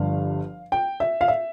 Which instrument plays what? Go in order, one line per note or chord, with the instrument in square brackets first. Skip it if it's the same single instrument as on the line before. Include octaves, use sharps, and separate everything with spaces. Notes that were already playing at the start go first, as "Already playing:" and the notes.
Already playing: [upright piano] G1 G2 F3 F5
G5
E5
F5
E5